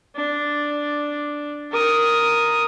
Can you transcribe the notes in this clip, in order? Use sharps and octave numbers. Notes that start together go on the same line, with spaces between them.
D4
A#4 D#6